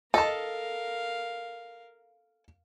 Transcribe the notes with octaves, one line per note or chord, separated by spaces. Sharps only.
A4 A#4 D#5 F5 A5